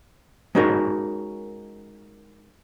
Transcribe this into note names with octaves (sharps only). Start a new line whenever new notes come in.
G#3 C#4 D#4 F#4 A#4